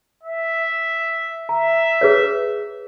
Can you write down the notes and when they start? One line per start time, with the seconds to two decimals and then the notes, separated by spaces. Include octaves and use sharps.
0.23 E5
1.49 E5 A#5
2.01 G#4 B4 C#5